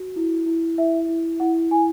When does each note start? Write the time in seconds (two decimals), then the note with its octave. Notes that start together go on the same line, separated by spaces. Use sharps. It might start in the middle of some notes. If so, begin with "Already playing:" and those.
Already playing: F#4
0.16 E4
0.46 E4
0.78 E4 E5
1.09 E4
1.40 E4 F#5
1.71 E4 G#5